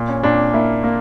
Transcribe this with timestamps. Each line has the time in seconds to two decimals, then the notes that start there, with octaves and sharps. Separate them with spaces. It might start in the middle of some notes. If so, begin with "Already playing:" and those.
Already playing: A#2
0.09 C#4
0.23 A#2 D4
0.53 A#3 E4
0.84 A#3